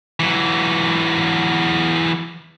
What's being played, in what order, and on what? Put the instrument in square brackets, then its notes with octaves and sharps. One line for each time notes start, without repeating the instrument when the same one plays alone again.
[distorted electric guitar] E3 F#3